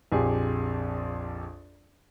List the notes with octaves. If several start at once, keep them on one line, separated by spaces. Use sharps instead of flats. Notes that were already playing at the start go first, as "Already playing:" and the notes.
A#1 F2 G4 G#4